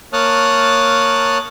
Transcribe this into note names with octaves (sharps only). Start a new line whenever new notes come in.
A#3 C#5 A5 D#6 F6 F#6